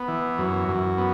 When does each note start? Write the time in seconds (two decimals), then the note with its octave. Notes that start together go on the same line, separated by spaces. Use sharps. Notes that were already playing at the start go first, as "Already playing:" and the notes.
Already playing: B3
0.08 E3
0.38 F#2
0.69 F#2
0.98 B3